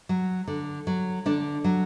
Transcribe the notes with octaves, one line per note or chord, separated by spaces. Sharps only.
F#3
D3
F#3
D3 D4
F#3